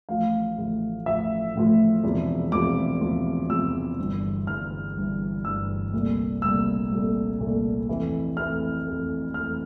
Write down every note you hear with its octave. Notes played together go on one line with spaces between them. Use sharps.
A1 A2 F3 F5
A1 A2 F3
A1 A2 F3 E5
A1 A2 F3
E1 E2 C3 F3
E1 E2 C3 F3 D6
E1 E2 C3 F3
E1 E2 C3 F3 E6
G1 G2 E3
G1 G2 E3 F6
G1 G2 E3
G1 G2 E3 E6
C2 A#2 A3
C2 A#2 A3 E6
C2 A#2 A3
C2 A#2 A3
F2 E3 A3
F2 E3 A3 F6
F2 E3 A3
F2 E3 A3 F6